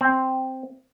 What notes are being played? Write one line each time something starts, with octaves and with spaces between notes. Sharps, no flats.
C4